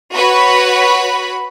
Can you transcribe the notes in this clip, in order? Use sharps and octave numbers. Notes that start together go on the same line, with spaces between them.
F#4 B4 C#5 B5